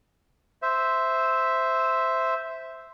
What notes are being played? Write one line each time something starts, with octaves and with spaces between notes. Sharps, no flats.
C5 E5